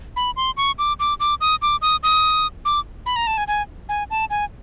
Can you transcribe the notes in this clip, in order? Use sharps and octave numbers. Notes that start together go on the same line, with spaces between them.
B5
C6
C#6
D6
D6
D6
D#6
D6
D#6
D#6
D6
B5
A#5
A5
G#5
G#5
G#5
A5
G#5